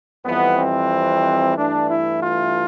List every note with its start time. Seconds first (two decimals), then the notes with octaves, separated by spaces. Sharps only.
0.24 F2 E3 G3 B3
0.57 C4
1.56 G2 E3 A3 D4
1.89 E4
2.22 F4